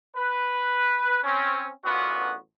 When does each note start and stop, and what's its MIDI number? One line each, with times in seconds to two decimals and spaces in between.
0.16 1.19 71
1.24 1.69 60
1.24 1.69 61
1.85 2.35 33
1.85 2.35 42
1.85 2.35 50
1.85 2.35 59
1.85 2.35 65
1.85 2.35 66